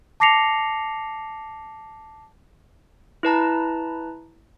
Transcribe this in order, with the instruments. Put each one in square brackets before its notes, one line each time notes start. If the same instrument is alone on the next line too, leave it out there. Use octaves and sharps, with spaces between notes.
[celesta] A5 D6 A#6 C7 C#7 F7
[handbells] E4 B4 A5 A#5